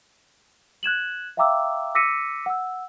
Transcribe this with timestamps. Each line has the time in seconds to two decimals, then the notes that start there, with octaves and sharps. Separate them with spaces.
0.83 F#6 G#6 E7 F#7
1.37 E5 F5 G5 A#5 D6 E6
1.95 D6 E6 A#6 B6 C#7 D#7
2.46 F#5 E6